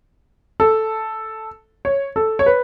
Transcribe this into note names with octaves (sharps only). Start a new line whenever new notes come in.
A4
C#5
A4
C#5
B4